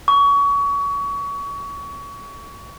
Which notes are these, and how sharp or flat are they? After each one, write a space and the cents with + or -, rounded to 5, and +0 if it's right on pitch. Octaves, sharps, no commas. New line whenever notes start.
C#6 +30